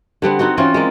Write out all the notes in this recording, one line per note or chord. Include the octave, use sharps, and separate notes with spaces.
D3 G3 B3 C4
B3 C4 D#4 F#4
E3 C4 C#4 F4
G#3 A#3 D5